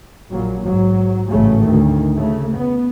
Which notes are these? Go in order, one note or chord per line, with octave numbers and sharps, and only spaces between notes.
A#1 A#2 F#3
G#2 F#3
A1 G#2 C#3 F#3 A3
D2 D#3
C#3 A3
B3